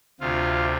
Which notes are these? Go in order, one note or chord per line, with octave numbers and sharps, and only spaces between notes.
D2 C3 F4